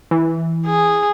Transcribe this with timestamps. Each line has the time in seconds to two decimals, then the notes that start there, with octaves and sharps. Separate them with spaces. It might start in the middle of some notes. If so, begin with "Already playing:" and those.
0.11 E3
0.66 G#4